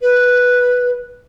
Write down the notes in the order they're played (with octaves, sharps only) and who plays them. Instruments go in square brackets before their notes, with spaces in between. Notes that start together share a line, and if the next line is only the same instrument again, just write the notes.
[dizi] B4